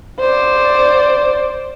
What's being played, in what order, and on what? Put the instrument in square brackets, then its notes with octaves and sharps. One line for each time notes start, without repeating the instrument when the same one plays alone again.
[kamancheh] C5 D5